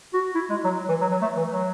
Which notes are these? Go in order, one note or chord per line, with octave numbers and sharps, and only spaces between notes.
F#4
E4
G#3
F#3
E3
F#3
F#3
A3
E3
F#3